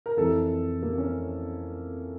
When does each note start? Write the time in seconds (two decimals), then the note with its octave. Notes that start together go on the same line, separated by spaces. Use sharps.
0.06 A#4
0.17 F2 E3 A4
0.82 A#3
0.98 C#4